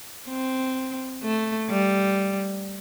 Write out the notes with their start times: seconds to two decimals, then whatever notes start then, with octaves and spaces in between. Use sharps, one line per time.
0.28 C4
1.23 A3
1.70 G3